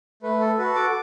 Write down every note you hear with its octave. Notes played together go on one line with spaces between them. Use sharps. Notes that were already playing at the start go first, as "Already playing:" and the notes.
A3 B4
A4
F#4 A4 B4
D6